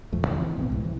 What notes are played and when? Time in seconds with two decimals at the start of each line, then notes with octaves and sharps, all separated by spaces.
0.12 D#1 F2 F3 A3
0.27 E2 D3
0.40 C3 E3 C4
0.57 A#1 A2 B3 C4
0.70 C2 G#2 E3
0.84 C3 E3